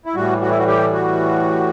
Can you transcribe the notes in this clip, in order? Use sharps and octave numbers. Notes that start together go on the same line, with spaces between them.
E4
A2 E3 G3 F#4
F#4
E4
F#4
G4
F#4